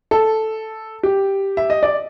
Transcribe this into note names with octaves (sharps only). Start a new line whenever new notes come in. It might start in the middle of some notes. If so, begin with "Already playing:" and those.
A4
G4
E5
D#5
D5